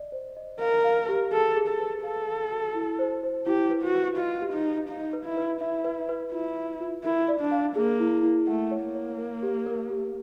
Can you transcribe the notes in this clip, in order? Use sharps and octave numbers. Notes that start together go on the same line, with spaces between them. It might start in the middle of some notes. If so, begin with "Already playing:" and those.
Already playing: D5 D#5
C5
D#5
A#4 F5
F5
G4
G#4 A4
G#4
A4
B4
A4 F5
F5
F#4
E4
C5
C5
E4 G4
B4
F#4
B4
F4 D#5
G4
D#4
D#5
D#4 F5
B4
E4
B4
E4 E5
B4
B4
E4 F4
F4
F4
E4 A#4
D5
D4
F5
A#3 G#4
E4
E4
A3 F#5
C#5
A#3
C#5
A#4
G4
A#4
G4